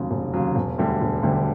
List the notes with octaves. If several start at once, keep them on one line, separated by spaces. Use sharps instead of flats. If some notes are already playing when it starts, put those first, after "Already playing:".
Already playing: F1 D#2 C#3 F#3
F1
D#2 C#3 F#3
E1
D2 D3 G3
E1
D2 D3 G3